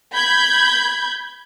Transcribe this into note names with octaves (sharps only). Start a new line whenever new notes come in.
B5 G6 G#6